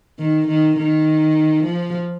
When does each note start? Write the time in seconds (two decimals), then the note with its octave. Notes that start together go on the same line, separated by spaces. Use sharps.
0.19 D#3
0.48 D#3
0.77 D#3
1.64 F3